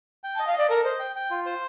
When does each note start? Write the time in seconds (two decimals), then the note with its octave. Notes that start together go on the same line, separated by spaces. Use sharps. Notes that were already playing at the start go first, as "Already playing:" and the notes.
0.24 G5
0.35 D#5 A5
0.47 F5
0.53 D5 D#5
0.69 A4 A#4
0.84 C5 D#5
1.00 G5
1.16 G5
1.31 F4
1.46 C5